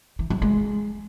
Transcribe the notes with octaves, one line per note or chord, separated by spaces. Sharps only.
E3
F#3
G#3